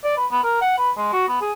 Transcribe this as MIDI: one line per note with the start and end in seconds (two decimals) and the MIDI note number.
0.04 0.15 74
0.17 0.26 71
0.31 0.40 59
0.44 0.61 70
0.61 0.74 78
0.78 0.91 71
0.97 1.10 56
1.13 1.25 66
1.28 1.38 59
1.41 1.52 68